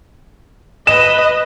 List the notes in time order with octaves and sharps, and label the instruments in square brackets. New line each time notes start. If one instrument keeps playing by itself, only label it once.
[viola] B4 D#5 [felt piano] E7